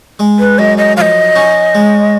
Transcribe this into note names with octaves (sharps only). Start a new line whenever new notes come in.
G#3
B4
F#2 D#5
D#5
F3 D#5 F5
C#4
G#3